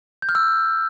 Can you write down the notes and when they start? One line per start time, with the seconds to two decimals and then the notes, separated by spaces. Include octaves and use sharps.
0.22 G6
0.29 F6
0.35 E6